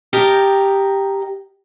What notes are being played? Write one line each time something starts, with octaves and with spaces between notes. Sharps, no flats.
G4 A#4 D#5 G5 A5